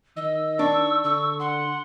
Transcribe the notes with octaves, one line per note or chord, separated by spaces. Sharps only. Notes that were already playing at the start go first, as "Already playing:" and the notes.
D#3 D#5 E6
D4 C#6
D3 C#6
F#5 C6